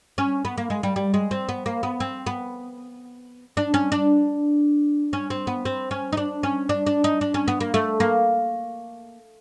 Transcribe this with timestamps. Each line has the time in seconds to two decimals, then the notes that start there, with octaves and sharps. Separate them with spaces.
0.18 C#4
0.45 B3
0.58 A#3
0.70 G#3
0.83 G3
0.96 G3
1.14 G#3
1.31 C4
1.49 B3
1.66 A#3
1.83 B3
2.00 C4
2.26 B3
3.57 D4
3.74 C#4
3.92 D4
5.13 C#4
5.30 C4
5.47 B3
5.65 C4
5.91 C#4
6.13 D#4
6.17 D4
6.43 C#4
6.69 D4
6.86 D4
7.04 D#4
7.21 D4
7.34 C#4
7.48 B3
7.60 A#3
7.74 A3
8.00 A#3